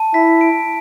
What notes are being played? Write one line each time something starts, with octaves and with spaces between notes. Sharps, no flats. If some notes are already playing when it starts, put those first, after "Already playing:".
Already playing: A5
E4 B6
D7